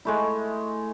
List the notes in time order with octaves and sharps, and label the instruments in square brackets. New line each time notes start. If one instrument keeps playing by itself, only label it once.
[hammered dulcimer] G#3 A3 E4